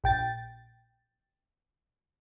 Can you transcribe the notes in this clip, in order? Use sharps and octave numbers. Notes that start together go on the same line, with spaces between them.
A#1 G5 A6